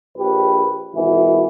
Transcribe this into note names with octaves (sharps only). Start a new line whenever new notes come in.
A#1 G4 B4
G#1 B2 E3